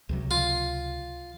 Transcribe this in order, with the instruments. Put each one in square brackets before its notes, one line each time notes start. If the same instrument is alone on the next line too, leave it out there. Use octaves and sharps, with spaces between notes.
[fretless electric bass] C#2 C3 F#3
[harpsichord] F4